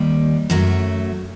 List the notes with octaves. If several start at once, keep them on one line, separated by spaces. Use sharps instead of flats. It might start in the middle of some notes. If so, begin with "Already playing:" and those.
Already playing: D#2 D#3 G3
F#2 F#3 A3